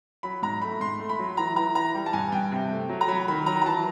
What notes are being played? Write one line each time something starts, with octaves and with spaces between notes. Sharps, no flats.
F#3 B5
G#2 A#5
A3 B5
G#2 C6
A3
B5
F#3
E3 A#5
E3 A#5
E3 A#5
G3
A5
G2 G#5
G2 G5
C3
A3
F#3
A#5
F#3 B5
D#3 B5
F#3 A#5
A#5
E3 A5